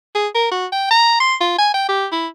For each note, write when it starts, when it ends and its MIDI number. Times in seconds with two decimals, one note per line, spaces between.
0.15 0.28 68
0.35 0.49 70
0.51 0.66 66
0.72 0.90 79
0.91 1.19 82
1.20 1.35 84
1.41 1.56 65
1.58 1.73 80
1.74 1.85 79
1.89 2.06 67
2.12 2.27 64